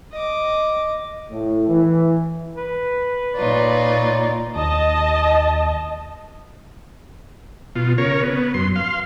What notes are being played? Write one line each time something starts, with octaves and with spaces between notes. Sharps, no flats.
D#5 D6
A2
E3
B4
A#2 D#4 F4 C#5 D5
D#2 D#5 A5
B2 F4
C#3 A#4 C#5
B3
F#2 C6
F5 C6